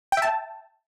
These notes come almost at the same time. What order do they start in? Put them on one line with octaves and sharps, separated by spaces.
G5 E5 A5